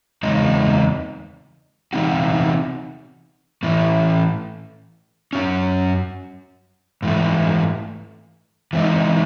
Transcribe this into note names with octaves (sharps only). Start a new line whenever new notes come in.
E2 C#3 G#3 C4 D#4
C3 E3 C4 D#4 F#4
A2 E3 A3
F#2 D#3 F#3 C#4
G#2 E3 A3
E3 G#3 C4 D#4